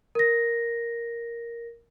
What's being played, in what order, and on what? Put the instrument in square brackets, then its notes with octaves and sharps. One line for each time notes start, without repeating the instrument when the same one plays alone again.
[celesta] A#4 A#6